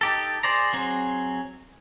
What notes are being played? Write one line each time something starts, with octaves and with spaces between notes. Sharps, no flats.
D#4 G4 A4
G#4 C5 D5 A#5
F#3 C4 G#4